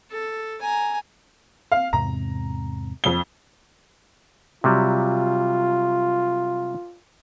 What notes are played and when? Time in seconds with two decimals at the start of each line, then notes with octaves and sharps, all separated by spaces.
0.11 A4
0.61 G#5 A#5
1.72 F5
1.93 E2 G#2 C3 A#5
3.04 F2 G7
4.64 C3 F#3 G3 F4